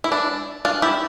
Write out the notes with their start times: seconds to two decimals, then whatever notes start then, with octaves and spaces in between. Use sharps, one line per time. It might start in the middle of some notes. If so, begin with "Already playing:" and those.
0.04 E4
0.12 D4
0.65 D4 F4
0.82 E4 G4